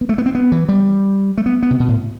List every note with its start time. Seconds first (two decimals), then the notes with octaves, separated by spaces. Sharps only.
0.01 B3
0.09 A3
0.18 B3
0.26 C4
0.35 B3
0.52 E3
0.69 G3
1.37 A3
1.46 B3
1.63 B3
1.71 C3
1.80 B2
1.88 A2